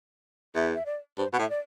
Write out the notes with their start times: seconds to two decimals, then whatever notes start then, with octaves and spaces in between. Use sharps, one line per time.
0.55 E2 E5
0.75 E5
0.86 D5
1.18 G2 C5
1.33 B2 F#5
1.39 A2
1.41 E5
1.50 D5